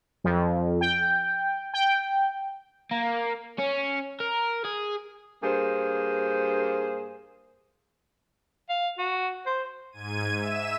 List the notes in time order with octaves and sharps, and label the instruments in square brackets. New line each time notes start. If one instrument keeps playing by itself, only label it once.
[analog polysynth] F2
G5
G5
[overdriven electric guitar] A#3
C#4
A#4
G#4
[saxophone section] G2 A#3 G#4 C5
[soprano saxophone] F5
F#4
C5
[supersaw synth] G#2 G#6 D#7
E5 E7